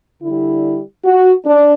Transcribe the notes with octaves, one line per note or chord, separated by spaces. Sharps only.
D3 E4
G3
F#4
D4